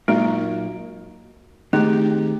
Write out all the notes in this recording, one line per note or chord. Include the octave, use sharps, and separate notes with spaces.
A#2 F#3 G#3 A#3 D#4 F#4
D#3 G#3 A3 C4 D#4 G4